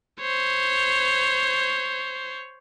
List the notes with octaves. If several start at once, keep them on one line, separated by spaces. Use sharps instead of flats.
C5 C#5